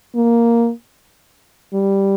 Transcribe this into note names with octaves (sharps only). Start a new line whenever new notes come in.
A#3
G3